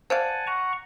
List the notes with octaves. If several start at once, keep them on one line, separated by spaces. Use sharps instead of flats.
C5 D5 F5 F#5 G#5 A5
F#5 A#5 C#6